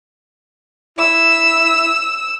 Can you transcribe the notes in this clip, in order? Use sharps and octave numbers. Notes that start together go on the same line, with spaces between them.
E4 E6